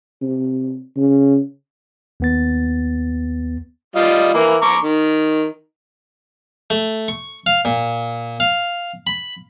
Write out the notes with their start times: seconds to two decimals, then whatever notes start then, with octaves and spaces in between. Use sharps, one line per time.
0.22 C3
0.97 C#3
2.20 D#2 B3 A6
3.96 G3 F4 D#5
4.34 E3 A#3
4.62 A#5 C#6 D6
4.83 D#3
6.70 A3
7.08 C#6
7.46 F5
7.65 A#2
8.40 F5
9.07 B5